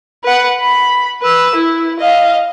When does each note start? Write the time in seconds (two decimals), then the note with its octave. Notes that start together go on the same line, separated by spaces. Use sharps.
0.24 B4 F#5
0.60 B5
1.22 B4 E6
1.55 E4
2.00 D#5 F5